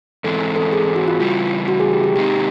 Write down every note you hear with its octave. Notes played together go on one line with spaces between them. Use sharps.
G#2 E3 G#3 C4 A4
A4
G#4
G#4
F#4
F4
C#3 E3 G3 F4
F#4
G#4
G4
G4
C3 D#3 G#3 C4 D#4 G4